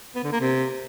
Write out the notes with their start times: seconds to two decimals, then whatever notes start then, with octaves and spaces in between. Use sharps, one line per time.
0.15 B3
0.24 D3
0.32 A#3
0.41 C3